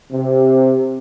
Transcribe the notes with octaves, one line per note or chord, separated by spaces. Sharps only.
C3